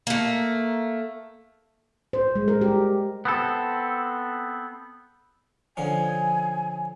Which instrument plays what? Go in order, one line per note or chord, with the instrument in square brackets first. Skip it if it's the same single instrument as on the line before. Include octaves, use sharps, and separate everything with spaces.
[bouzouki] A3 A#3
[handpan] C5
G#3
A#4
G4
[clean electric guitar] B3 C4 A4
[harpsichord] D3 F3 C#4 [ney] G#5